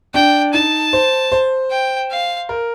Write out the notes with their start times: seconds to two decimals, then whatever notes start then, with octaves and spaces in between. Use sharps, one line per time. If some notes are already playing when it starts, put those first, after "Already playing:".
0.14 D4 G5
0.53 D#4 A5
0.93 C5
1.32 C5
1.71 G5
2.11 F5
2.49 A#4